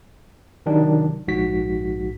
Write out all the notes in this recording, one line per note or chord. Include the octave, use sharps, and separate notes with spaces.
C3 D#3 F#3 D4 D#4
A#1 G#2 F#4 B6